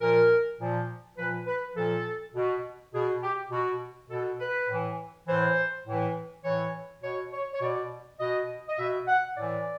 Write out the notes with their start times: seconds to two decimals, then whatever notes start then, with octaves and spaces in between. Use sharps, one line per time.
0.01 A#2 F3 A#4
0.59 A#2 F3
1.17 A#2 F3 B4
1.46 B4
1.76 A#2 F3 A4
2.34 B2
2.93 B2 G#4
3.22 G4
3.51 B2 F#4
4.10 B2 A4
4.40 B4
4.69 A2 E3
5.27 A2 E3 C5
5.86 A2 E3
6.44 A2 E3 C#5
7.02 B2 C#5
7.33 C#5
7.53 C#5
7.61 B2 D5
8.20 B2 D#5
8.69 D#5
8.79 B2 E5
9.08 F#5
9.36 A2 E3 D5